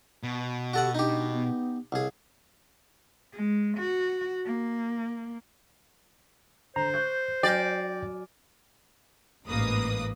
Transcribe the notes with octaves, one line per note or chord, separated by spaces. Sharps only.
B2
F#4 G4 A4 F#5
D4 D#4 G4
B3
C2 G#4
G#3
F#4
A#3
D3 C5 A#5
C#6 F#6 G6
F#3 D5 G5 G#5 F6 G6 A#6
A1 G#2 A#3 B4 D#6